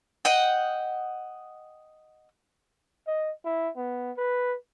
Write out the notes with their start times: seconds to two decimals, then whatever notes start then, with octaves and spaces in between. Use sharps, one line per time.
0.25 D#5 F#5 G5
3.07 D#5
3.45 E4
3.76 B3
4.17 B4